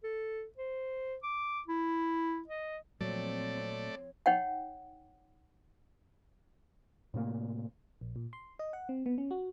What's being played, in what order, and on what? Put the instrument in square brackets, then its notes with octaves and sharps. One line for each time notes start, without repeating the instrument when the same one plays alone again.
[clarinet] A4
C5
D6
E4
D#5
[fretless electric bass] A#2 F#3 [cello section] F3 C4 [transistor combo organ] A3 D5 [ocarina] C#5
[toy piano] D#4 C#5 F#5 G5
[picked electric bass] A2 C3 A3 A#3
[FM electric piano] A#1
A#2
C6
D#5
F#5
C4
B3
C#4
F#4